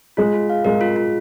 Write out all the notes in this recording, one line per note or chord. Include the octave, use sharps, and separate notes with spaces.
G#3 F4
F4
F5
G#3 A#4
F4
F4